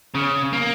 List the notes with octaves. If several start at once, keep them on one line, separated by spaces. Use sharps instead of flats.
C#3
A#3